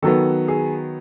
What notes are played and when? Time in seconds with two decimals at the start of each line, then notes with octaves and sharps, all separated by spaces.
0.02 D#3 F#3 B3 A4
0.48 G#4